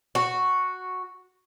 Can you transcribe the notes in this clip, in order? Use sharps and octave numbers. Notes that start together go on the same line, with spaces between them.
F#4